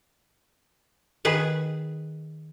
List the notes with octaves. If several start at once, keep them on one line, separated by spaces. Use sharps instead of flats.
D#3 G#4 B4